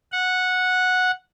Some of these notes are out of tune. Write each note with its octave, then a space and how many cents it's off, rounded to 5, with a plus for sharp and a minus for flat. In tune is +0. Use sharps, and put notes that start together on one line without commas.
F#5 -10